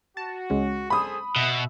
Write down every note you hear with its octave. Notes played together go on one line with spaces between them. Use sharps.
F#4 A5
C#2 G#3 C#4
G#4 A4 C5 B5 D#6
B2 E5